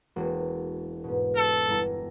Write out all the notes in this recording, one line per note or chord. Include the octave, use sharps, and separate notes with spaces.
E1 A#3 F#4
G#2 B2
A4
G1 E4 A#5